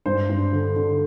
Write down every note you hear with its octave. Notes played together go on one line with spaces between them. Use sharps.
G2 C5
G2
D3
D3